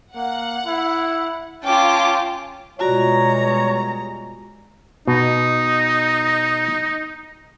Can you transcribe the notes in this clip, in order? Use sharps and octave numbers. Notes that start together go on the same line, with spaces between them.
A#3 F#5
E4
C#4 F4 G5 A5 D6
B2 G3 G#3 F4 F#4 C#5 D5 A#5
B2 D#4